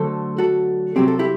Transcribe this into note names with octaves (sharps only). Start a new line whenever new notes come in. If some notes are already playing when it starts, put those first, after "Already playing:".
Already playing: D3 F#3 A3 A4 C5
F#4 A4
C3 F#3 C4 G4
A4
E4 G4